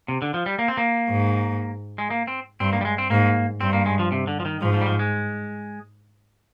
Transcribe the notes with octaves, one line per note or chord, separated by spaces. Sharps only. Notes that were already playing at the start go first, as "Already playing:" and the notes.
C3
D3
F3
G3
A#3
C4
A#3
G#2
G#3
A#3
C4
G2 C4
A#3
G3
G#3
C4
G#2 A#3
G2 C4
A#3
G#3
F3
C3
D3
F3
D#3
G#2 F3
F3
G3
F3
G#3